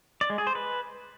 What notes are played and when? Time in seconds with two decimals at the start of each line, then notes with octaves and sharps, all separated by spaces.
0.21 D5
0.30 G#3
0.38 G#4
0.47 C5
0.55 B4